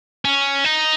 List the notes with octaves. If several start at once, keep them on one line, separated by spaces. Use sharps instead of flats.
C#4
D#4